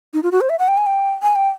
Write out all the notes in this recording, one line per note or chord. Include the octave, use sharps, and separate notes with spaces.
D#4
F4
F#4
C5
E5
F#5
G5
G#5
G5
G#5
G5